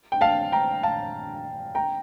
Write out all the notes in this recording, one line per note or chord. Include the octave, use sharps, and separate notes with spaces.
G5
F5 A5
G5 A#5
F5 A5
G5 A#5